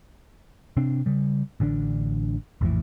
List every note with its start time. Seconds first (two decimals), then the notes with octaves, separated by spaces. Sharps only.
0.77 C3 C4 D4
1.06 C#3 G3
1.60 A1 D3 F#3 D4
2.61 A#1 F2 A2 E3